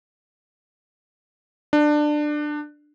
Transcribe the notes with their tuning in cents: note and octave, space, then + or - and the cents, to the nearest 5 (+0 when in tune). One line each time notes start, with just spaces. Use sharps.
D4 +20